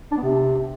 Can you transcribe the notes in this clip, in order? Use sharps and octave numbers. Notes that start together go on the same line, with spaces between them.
D4
B3
C3